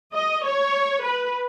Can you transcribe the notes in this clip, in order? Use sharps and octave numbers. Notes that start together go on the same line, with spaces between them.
D#5
C#5
B4